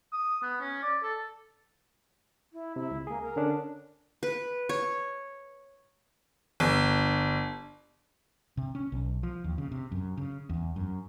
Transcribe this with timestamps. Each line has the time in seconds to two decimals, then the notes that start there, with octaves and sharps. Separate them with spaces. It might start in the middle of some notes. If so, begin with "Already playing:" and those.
0.13 D#6
0.43 B3
0.60 C#4
0.83 D5
1.03 A4
2.53 E4
2.76 C3 E4
2.91 C#2
3.07 A#3 G#4
3.23 A#4
3.36 D3 C#4 D4
4.23 B4
4.69 C#5
6.60 G1
8.57 C3
8.75 C#4
8.92 B1
9.23 F3
9.44 D#2
9.58 C#3
9.72 C3
9.92 F#2
10.17 C#3
10.49 E2
10.76 F#2